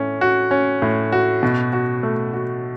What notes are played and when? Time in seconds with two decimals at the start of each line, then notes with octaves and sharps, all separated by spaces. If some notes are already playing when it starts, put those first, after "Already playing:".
Already playing: A2 C#4
0.21 F#4
0.51 C#4
0.82 A2
1.12 F#4
1.43 B2
1.73 F#4
2.03 A3
2.34 F#4